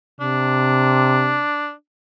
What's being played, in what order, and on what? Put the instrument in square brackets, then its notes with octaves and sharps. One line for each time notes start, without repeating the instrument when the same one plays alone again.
[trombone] C3 [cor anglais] D4